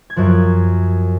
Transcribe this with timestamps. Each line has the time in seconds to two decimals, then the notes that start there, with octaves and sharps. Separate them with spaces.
0.10 G#6
0.16 F#2 F3 F#6